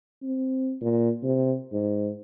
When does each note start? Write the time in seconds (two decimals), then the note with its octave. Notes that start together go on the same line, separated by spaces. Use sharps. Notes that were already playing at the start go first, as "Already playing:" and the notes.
0.22 C4
0.81 A#2
1.23 C3
1.72 G#2